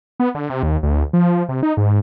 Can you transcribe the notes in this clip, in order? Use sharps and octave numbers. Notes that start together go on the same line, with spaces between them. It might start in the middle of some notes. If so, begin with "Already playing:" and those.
B3
D3
C3
D#2
D2
F3
C3
D#4
G#2